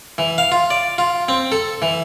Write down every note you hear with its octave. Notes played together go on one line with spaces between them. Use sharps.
E3
F5
F4
D5
F4
C4
A4
E3